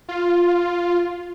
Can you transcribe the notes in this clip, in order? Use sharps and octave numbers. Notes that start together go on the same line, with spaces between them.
F4